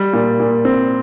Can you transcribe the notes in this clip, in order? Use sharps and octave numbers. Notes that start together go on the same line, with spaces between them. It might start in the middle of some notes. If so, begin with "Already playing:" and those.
Already playing: G3
A#2
A#2
C4